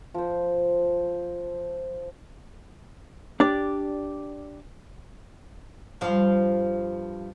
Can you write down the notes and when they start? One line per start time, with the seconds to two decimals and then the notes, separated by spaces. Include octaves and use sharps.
0.14 F3 C5
3.40 D4 G4 D5
6.01 G2 F3